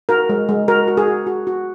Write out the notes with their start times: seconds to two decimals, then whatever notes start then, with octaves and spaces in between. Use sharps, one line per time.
0.09 F#4 A#4
0.29 G#3
0.49 G#3
0.68 F#4 A#4
0.88 F#4
0.97 G#4
1.07 F#4
1.27 F#4
1.47 F#4